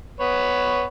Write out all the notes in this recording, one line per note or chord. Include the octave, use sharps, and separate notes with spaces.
B3 B4 C#5